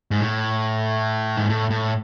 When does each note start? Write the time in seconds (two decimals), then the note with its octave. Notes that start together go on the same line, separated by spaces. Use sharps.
0.11 G#2
0.21 A2
1.37 G#2
1.49 A2
1.70 A2